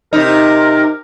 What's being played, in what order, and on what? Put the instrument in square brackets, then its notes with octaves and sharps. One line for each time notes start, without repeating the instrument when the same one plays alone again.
[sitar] C3 D#4 [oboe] A#4